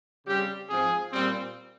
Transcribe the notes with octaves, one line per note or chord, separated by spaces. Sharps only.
C#3 G3 C4 G4
G#2 F3 C4 G#4
A#2 G3 C4